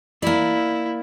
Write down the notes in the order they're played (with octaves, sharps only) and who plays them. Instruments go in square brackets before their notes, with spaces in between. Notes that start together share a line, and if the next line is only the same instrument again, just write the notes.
[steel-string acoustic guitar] A#3 D5 [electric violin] E4